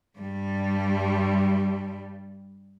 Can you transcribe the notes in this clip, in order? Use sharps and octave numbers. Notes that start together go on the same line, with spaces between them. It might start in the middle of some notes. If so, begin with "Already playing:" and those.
G2 G3